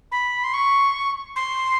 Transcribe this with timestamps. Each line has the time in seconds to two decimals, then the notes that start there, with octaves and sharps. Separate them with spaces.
0.12 B5
0.44 C6
0.54 C#6
1.36 C6